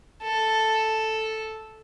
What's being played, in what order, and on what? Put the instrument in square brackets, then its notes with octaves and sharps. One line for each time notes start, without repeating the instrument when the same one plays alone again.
[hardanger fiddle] A4